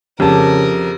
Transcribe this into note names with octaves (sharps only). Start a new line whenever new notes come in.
F2 C#3 G4 A#4 A5